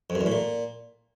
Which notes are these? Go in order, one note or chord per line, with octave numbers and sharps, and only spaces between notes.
F2
F#2
E2
A2
A#2